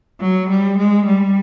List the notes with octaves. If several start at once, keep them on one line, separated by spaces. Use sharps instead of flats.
F#3
G3
G#3
G3